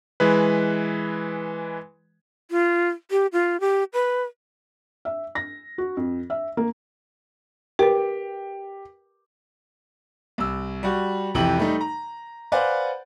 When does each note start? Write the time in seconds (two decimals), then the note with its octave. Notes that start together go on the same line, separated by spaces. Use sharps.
0.20 E3 G#3 B4
2.51 F4
3.11 G4
3.33 F4
3.60 G4
3.93 B4
5.05 E5
5.35 A#6
5.78 F#4
5.97 F2
6.30 E5
6.57 A#3
7.79 G4 A#4 B4
10.38 C2 E6
10.83 G3 F#4
11.34 F2 C3 E3 G4 F#7
11.58 G3 A3 D#4
11.81 A#5
12.52 B4 C5 D5 F5 F#5 G#5